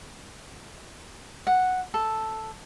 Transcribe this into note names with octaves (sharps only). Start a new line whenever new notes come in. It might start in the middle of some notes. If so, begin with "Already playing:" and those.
F#5
A4